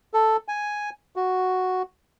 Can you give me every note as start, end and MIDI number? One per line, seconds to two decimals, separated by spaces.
0.14 0.37 69
0.48 0.90 80
1.16 1.82 66